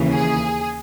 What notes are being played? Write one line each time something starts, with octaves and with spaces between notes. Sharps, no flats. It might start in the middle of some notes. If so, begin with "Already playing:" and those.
Already playing: D#2 C#3 E3
G#4